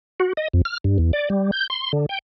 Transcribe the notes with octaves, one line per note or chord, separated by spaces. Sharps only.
F#4
D#5
F2
F6
G2
E2
D5
G3
G6
C6
D3
G5